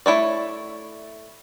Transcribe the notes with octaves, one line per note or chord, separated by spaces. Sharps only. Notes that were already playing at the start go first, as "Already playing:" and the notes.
A3 E4 C#5 D5